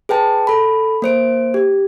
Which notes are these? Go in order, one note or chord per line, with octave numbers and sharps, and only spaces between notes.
G#4 B4 G5 A5
A4 B5
A#3 C5 D7
G4